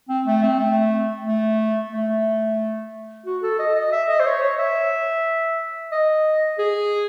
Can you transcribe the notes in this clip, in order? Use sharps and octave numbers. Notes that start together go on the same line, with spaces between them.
C4
A3
C4
A3
A3
A3
F#4
A4
D#5
D#5
E5
D#5
C5
C#5
C#5
E5
D#5
G#4